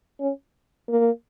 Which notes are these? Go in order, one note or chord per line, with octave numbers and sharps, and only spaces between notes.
C#4
A#3